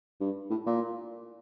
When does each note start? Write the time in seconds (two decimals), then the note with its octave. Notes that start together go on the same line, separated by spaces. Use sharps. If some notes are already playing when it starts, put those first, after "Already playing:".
0.20 G2
0.50 A2
0.66 A#2